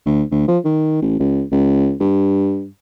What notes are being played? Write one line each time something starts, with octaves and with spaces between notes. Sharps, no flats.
D2
D2
F3
D#3
A1
C#2
C#2
G2